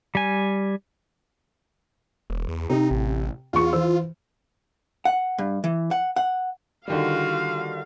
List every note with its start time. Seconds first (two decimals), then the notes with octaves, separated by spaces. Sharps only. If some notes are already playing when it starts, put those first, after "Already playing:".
0.15 G3 G#5
2.30 E1
2.48 E2
2.70 C3 D#4
2.91 A1
3.53 E2 B3 F4 C#6
3.73 E3 C5 E6
5.05 F#5
5.38 G2
5.64 E3
5.91 F#5
6.16 F#5
6.88 D3 D#3 G3 F4 F#4 F5